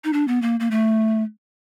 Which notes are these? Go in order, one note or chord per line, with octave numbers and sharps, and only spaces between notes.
D#4
D4
B3
A#3
A#3
A3